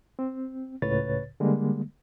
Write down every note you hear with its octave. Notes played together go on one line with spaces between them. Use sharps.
C4
C#2 A2 C#3 B4 C#5 A6
D3 G3 G#3 A#3